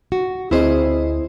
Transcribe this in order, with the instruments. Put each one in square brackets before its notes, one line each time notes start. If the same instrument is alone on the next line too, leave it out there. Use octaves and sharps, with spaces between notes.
[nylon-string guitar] F#4
[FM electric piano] D2 C4 D#5 [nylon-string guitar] E4 G#4 C5